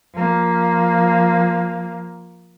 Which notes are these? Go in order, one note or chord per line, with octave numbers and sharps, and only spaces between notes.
F3 A#3